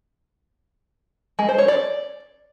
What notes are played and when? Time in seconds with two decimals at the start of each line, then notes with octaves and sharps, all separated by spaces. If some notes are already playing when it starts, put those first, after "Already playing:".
1.39 G#3
1.49 C5
1.58 C#5
1.68 D5